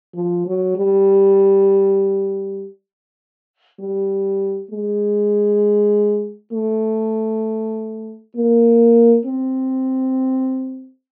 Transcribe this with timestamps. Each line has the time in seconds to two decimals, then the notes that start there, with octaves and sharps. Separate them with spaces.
0.15 F3
0.46 F#3
0.76 G3
3.79 G3
4.71 G#3
6.52 A3
8.35 A#3
9.25 C4